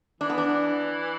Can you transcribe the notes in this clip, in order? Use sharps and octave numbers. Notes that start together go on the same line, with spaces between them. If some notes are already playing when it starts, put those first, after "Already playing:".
E3 D4
B3
D4